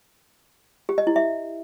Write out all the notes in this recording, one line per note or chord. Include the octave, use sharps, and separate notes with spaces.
G4
D#5
E4
E5